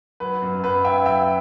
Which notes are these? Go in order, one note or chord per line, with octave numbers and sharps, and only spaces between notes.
F#3 B4
F#2
F#2 B4
F#3 E5 G5
F#3 E5 G5